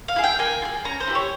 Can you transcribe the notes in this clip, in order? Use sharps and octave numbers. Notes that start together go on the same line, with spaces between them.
F5
E4 G#4
G5
A#3 G#5
F4
G#4
C#4 A#5
C5
E4 G4
C#5